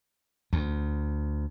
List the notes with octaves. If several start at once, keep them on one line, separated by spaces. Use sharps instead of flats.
D2